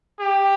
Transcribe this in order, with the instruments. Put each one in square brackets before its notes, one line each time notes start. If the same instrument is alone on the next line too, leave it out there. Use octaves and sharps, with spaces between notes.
[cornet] G4